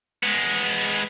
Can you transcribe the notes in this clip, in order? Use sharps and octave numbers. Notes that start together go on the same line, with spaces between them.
G#3 B3